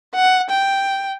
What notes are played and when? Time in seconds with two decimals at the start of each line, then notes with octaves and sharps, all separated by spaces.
0.15 F#5
0.50 G5